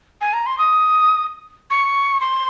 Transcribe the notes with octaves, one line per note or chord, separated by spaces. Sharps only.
G#5
A#5
C6
D#6
C#6
C6